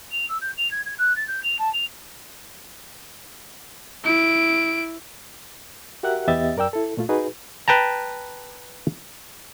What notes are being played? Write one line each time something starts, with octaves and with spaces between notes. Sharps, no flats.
F7
E6
G6
F7
G#6
G#6
F#6
A6
G6
F7
A5
F7
E4 D7
F#4 G4 A#4 E5 F#5 F#6
E2 B3 G4 D#5 E5 A6
F#2 A#4 D5 G5 E6
E4 A4
A#2 A3 F4
D#4 F#4 G#4 B4
B4 G5 A5 A#5